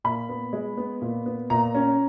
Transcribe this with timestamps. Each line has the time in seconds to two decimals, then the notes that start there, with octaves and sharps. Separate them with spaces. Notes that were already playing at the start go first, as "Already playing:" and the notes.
0.04 A#2 B5
0.29 B3
0.53 G#3
0.77 B3
1.02 A#2
1.26 B3
1.50 A#2 A#5
1.75 C#4